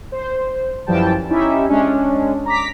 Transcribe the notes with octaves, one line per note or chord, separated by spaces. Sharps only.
C5
F#2 E3 F3 G3 G5 A5
C#4 D#4 E4 G4 E5
G#3 C#4 D4
A#5 D6 B6